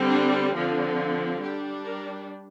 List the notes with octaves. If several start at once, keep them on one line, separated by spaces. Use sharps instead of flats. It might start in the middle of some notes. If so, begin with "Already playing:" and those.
Already playing: D3 G3 C4
D4
D3 F3 C4
G3 D4 G4
A#4